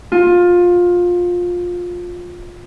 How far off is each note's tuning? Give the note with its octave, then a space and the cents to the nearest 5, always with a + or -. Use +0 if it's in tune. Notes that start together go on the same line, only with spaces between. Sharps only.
F4 +20